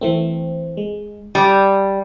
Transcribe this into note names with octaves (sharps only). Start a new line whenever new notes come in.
E3 A3 C4
G#3
G3 D5 A5